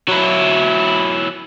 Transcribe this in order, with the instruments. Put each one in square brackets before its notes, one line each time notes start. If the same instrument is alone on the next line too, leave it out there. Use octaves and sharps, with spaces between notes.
[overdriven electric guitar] F#3 E4